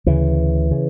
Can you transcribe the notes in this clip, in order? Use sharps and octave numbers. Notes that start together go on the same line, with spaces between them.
D2 C#3 E3
C#3